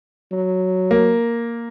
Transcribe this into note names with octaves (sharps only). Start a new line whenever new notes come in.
F#3
A#3